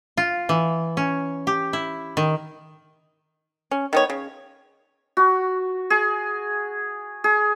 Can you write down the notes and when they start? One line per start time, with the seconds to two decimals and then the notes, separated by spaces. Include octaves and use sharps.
0.17 F4
0.49 E3
0.97 C#4
1.47 G4
1.73 E4
2.17 D#3
3.71 C#4
3.93 D#3 B3 C#5
4.10 C#3
5.17 F#4
5.90 G#4
7.24 G#4